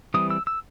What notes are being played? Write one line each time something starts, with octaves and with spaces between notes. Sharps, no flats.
E3 G3 C4 D#6
E6
E6